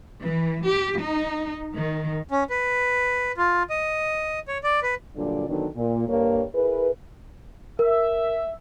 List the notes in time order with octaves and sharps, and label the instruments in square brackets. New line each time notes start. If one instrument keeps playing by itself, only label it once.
[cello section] E3
G4
D#4
D#3
[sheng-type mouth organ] C#4
B4
F4
D#5
C#5
D5
B4
[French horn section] G2 A#2 D3 F#3 D5
D3 D#3 F#3 B3 D4
A#2
G2 A#3 C#5
E4 G#4 A#4 B4
[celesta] A#4 [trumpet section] E5